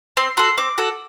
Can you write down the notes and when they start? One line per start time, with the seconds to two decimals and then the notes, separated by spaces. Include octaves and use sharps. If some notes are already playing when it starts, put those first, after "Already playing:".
0.17 C4 C6
0.37 F#4 A4 C6
0.58 C4 D6
0.78 F#4 A4